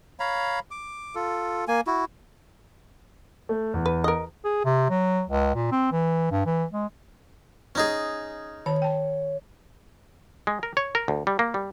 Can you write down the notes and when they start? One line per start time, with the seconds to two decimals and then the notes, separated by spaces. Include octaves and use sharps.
0.20 C#5 F5 A#5 B5
0.71 D6
1.15 F4 A4
1.68 A#3 G#5
1.87 E4 F#4
3.49 A3
3.74 E2
3.86 B4
4.04 A#4 D#5
4.44 G#4
4.64 C3
4.90 F#3
5.30 C#2
5.55 A#2
5.71 C4
5.92 E3
6.31 G2
6.46 E3
6.73 G#3
7.75 C#4 D#4 G#4
8.66 D#3 C#5 A5
8.82 G5 A5
10.47 G#3
10.63 A#4
10.77 C#5
10.95 A#4
11.08 D2
11.27 G3
11.39 A#3
11.54 G3